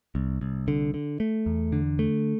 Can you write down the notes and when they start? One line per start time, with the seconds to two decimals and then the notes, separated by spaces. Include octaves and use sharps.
0.15 C2
0.41 C2
0.68 D3
0.94 D3
1.20 A3
1.46 E2
1.72 D3
1.99 A3